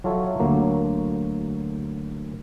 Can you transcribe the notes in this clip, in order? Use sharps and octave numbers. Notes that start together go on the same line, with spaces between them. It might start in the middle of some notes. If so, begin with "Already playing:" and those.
F#3 F4 A4 C#5 E5
D2 F#3 A#3